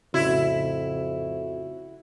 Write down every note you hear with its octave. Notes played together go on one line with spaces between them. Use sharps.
F2 A2 C#3 E4 F#4